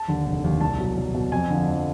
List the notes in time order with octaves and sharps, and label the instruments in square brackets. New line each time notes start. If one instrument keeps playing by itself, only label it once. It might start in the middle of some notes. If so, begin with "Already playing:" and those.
Already playing: [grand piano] A5
D#2 D3
F1
D#2 D3
C2 A5
B2 F#3
C2
B2 F#3
F2 G#5
D3 F3
F2